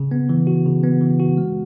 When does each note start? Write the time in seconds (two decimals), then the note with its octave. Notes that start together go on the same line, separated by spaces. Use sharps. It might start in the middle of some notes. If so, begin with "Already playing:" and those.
Already playing: C#3
0.11 B3
0.29 E3
0.47 F#4
0.66 C#3
0.84 B3
1.01 E3
1.19 F#4
1.38 G#3